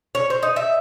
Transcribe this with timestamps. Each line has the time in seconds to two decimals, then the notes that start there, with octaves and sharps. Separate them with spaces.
0.15 C#5
0.30 C5
0.43 D#4
0.56 E5